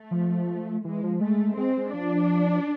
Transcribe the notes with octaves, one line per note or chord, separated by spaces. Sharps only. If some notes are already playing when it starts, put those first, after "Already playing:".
Already playing: A3
F3
E3 G#3
F3
G#3 A3
G#3 C4
G#3
F3 D4